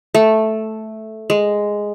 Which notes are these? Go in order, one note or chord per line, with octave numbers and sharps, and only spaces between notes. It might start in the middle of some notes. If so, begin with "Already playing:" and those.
A3
G#3